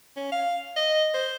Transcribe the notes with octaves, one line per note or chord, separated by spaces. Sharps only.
C#4
F5
D#5
C5